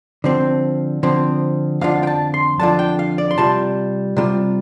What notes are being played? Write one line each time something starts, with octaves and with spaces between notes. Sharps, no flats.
D3 F3 C4
D3 F3 C4
F2 D3 F3 D4 F4 F5
G5
A5
C6
F2 D3 F3 D4 F4 A5
G5
F5
D5
C6
C3 G3 F4 A5
C3 G3 F4